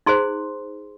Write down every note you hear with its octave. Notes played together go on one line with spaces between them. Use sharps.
D#4 G#4 C5 C6